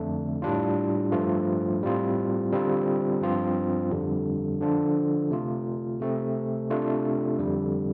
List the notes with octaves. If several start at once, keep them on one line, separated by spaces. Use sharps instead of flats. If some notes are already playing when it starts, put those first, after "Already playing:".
Already playing: F2 D3 A3 D4
A2 G3 D4 F4
G2 F3 A3 F4
A2 G3 C4 F4
D3 G3 C4 F4
G2 F3 C4 F4
F2 D3 G3
D3 F3 D4 F4
C3 A3 F4
C3 A3 C4
C3 A3 D4 F4
F2 D3 G3